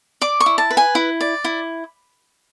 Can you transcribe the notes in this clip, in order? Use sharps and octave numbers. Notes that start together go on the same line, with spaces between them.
D5 D6
C#6
E4
A5
B4
G#5
E4
D5
E4